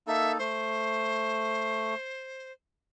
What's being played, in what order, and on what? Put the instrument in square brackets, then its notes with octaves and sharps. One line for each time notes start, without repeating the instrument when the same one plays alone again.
[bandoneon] A#3 D#4 A4 [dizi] E5
[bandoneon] A3 [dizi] C5